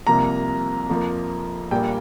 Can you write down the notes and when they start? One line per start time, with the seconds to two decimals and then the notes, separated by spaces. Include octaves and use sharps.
0.07 C2 C3 F3 A#3 A#5
0.89 F2 F3 A#3
1.71 A#1 A#2 G3 A#3 G5